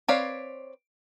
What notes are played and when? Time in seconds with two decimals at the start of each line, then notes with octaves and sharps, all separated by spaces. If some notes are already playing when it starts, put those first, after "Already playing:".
0.08 C4 B4 C#5 D5 F5